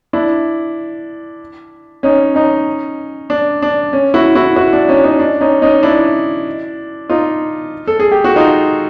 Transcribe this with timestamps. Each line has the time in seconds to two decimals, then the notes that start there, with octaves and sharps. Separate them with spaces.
0.13 D4 E4
2.03 C#4 D#4
2.35 C#4 D#4
3.30 D4
3.62 D4
3.93 C#4
4.14 E4 F#4
4.35 E4 F#4
4.56 E4 F#4
4.73 D4
4.88 C#4 D#4
5.04 C#4 D#4
5.19 D4
5.41 C#4 D#4
5.62 C#4 D#4
5.83 D4 E4
7.10 D#4 F4
7.87 A4
8.00 G#4
8.12 G4
8.24 F#4
8.36 D#4 F4